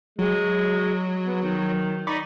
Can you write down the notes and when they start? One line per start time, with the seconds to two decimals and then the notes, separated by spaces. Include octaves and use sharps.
0.19 F#3 G#3
1.25 B3
1.43 D#3
2.07 D#4 D5 B5 C#6